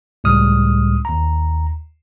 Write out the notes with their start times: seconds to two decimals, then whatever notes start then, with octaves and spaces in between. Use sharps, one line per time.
0.24 C#2 A2 G3 D#6 F6
1.05 D#2 A#5